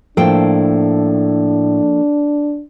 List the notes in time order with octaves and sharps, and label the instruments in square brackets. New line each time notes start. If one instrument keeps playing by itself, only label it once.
[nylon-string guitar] A2 C5 G5 [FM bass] F3 [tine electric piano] A#3 A4 [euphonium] D4